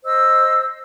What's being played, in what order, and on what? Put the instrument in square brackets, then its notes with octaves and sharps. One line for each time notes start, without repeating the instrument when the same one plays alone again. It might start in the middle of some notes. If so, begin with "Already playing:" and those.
[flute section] C5 D#5 E6